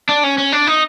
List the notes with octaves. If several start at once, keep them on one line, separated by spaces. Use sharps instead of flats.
D4
C#4
C#4
D4
D#4